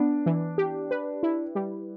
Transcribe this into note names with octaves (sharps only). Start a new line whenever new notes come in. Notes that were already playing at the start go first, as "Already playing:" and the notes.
Already playing: B3 D4
E3
G4
B4
E4
G3